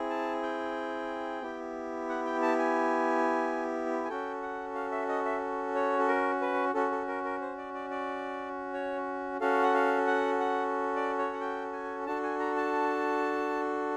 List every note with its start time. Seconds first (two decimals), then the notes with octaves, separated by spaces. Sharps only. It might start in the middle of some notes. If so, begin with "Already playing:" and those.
Already playing: C4 E4 G#4
0.10 A5
0.43 G5
1.42 B3 E4 G4
2.09 F#5
2.25 G5
2.42 A5
2.59 G#5
4.05 G#5
4.08 C#4 F#4 A4 G5
4.43 F#5
4.75 F5
4.92 E5
5.08 D#5
5.25 E5
5.75 C#5
5.99 A4
6.08 A#4
6.41 B4
6.74 C#4 F#4 A4
6.91 A4
7.08 A#4
7.25 A#4
7.41 C5
7.58 D5
7.74 D5
7.91 D5
8.74 C#5
9.40 C#4 F#4 A4 F5
9.63 F#5
9.74 F5
10.07 F#5
10.40 F#5
10.96 D5
11.19 C#5
11.33 F#5
11.41 G5
11.73 G#5
12.06 D4 F#4 A4 A5
12.23 G#5
12.40 A#5
12.56 A5